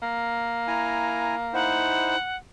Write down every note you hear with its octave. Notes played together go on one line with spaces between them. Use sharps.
A#3
E4 G#5 A#5
D#4 E4 C5 F#5